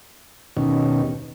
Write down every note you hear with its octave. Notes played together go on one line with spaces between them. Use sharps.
D#2 B2 D#3 C#4